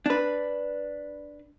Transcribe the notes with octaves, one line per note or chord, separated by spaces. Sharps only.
D4 B4